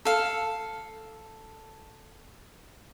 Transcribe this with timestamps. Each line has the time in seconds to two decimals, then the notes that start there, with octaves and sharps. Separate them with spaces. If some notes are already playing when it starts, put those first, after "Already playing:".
0.05 A4 F5